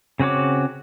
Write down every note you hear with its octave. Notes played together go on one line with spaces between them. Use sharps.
C#3 C4 F#4 C#5 D6